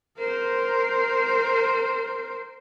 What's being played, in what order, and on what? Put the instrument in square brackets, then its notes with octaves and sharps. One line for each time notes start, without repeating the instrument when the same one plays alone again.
[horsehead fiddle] A#4 C5